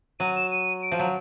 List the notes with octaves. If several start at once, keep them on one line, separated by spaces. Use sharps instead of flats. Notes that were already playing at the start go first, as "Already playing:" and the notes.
F#3 D#7
E7
D#7
D7
F3
F#3